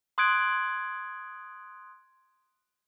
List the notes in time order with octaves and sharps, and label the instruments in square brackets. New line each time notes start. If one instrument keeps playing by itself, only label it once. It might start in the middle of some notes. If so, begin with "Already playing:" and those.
[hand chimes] C6 D#6 F#6 G#6 D7